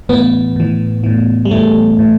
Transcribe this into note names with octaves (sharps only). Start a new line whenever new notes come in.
A2 E3 B3
A2 E3
A2 E3
G3
A2 E3 A3
A2 E3